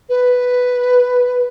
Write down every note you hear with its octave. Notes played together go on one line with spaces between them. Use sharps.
B4